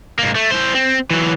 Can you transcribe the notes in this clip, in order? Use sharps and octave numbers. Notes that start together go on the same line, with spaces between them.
G#2 A#3
A3
E4 C5
C4
E3 F#3